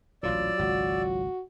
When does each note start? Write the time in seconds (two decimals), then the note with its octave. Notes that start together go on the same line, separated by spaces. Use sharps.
0.23 A1 D2 A#2 F#3 F4 D5 E6
0.59 G#1 C#2 F#4